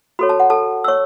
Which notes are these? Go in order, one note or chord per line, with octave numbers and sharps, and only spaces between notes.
F#4 A4 C#5 B5
A5
F#5
A4 A5
E6
C#5 C#6